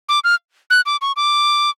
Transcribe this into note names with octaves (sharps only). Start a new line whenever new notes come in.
D6
F6
F#6
D6
C#6
D6